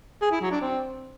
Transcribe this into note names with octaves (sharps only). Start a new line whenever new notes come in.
G#4
E4
F#3
D4
C4